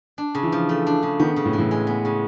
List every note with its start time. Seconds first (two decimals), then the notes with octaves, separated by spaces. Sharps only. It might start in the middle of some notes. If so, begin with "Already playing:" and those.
0.18 D4
0.35 C#3
0.43 E3
0.52 F3
0.69 A3
0.87 D4
1.03 C#3
1.20 D#3 B3
1.36 C#3
1.45 A2
1.53 E3
1.58 A2
1.71 G#3
1.87 B3
2.05 C#3